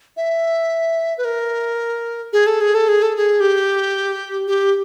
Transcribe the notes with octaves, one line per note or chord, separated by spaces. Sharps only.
E5
B4
A#4
G#4
A4
G#4
A4
G#4
A4
G#4
G4
G4